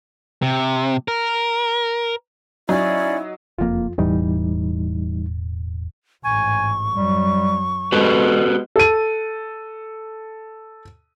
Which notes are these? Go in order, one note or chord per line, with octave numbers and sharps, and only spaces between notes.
C3
A#4
F#3 C#4 D#4 E4 D5
F#1 F2 A#2 A#3 F4
E1 E2 A2 E3 G3 D#4
A1 G#2 G#5 C#6
F#2 G3
G#3 B3 F#4 G4 A4 B4
A4 D#7